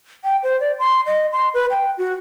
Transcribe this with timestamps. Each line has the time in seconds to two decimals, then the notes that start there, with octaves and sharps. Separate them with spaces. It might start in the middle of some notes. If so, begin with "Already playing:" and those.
0.24 G5
0.43 C5
0.60 D5
0.79 C6
1.06 D#5
1.32 C6
1.54 B4
1.70 G5
1.98 F#4